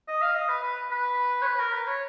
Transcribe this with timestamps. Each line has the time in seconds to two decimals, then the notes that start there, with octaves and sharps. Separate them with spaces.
0.08 D#5
0.22 F5
0.35 D#5
0.49 B4
0.63 B4
0.91 B4
1.42 C#5
1.46 B4
1.60 A#4
1.73 B4
1.87 C#5